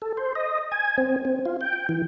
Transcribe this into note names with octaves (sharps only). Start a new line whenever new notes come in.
A4
C5
D#5
G#5
C4
C4
F4
G5
E3